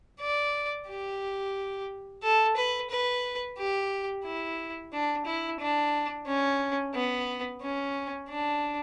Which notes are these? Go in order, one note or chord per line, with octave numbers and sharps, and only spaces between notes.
D5
G4
A4
B4
B4
G4
E4
D4
E4
D4
C#4
B3
C#4
D4